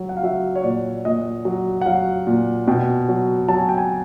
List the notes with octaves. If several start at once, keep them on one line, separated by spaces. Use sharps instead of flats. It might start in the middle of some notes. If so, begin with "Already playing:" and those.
Already playing: F#3
F#5
F5
F#3 E5
C#5
A#2 D5
A#2 D#5
F#3
F#5
F#3 F5
A#2
B2 G5
F#3
F#3 A5
G#5
G5
G#5